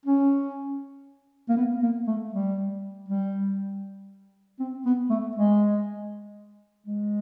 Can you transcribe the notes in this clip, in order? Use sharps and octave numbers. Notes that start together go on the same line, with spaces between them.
C#4
A#3
B3
A#3
A3
G3
G3
C4
B3
A3
G#3
G#3